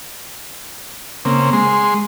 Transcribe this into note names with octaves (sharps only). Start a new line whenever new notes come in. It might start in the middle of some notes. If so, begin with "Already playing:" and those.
C#3 A#3 C4
G#3 C6